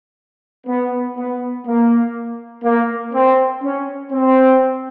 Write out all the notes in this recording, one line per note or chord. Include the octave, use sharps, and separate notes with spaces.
B3
B3
A#3
A#3
C4
C#4
C4